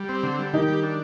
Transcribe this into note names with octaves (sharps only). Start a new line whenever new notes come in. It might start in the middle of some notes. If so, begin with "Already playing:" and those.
Already playing: G3
C4
D3
G3
D#3 D#4 G4
G3
D4